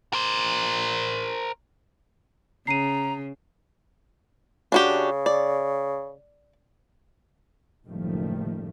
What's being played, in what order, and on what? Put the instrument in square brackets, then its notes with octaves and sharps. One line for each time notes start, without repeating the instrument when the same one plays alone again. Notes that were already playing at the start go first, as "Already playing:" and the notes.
[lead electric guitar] A#4 C5
[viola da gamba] C#3 [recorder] A#5 [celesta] C7 D#7
[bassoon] C#3 [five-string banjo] D4 F#4 G4
[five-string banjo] D5
[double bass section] F#1 A2 D#3 F3 G3 A3